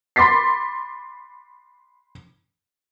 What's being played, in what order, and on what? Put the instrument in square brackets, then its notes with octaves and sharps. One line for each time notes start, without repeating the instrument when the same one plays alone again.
[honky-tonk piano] B5 C6 D6 A6 B6 C7